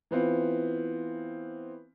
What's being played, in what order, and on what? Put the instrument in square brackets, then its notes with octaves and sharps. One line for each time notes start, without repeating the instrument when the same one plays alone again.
[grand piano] E3 B3 C4 F4